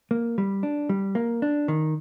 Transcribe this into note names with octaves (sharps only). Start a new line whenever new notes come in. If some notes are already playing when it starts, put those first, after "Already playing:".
A#3
G3
D4
G3
A#3
D4
D#3